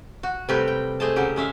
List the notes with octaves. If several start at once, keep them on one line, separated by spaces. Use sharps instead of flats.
F#4
C3 G3 A3 C4 G4 B4
G5
A3 G#4 C5 D#5 A5
C#3 F#3 C#4 G4
G#3 C#4 E5 F5